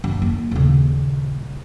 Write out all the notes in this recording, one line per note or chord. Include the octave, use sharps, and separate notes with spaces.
F#2
A#3
D#1 C#3